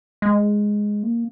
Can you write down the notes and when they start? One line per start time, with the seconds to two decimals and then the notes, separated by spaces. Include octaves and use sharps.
0.22 G#3
1.03 A#3